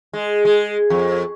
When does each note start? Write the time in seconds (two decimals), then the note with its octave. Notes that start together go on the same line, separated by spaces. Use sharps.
0.13 G#3
0.45 G#3
0.90 F2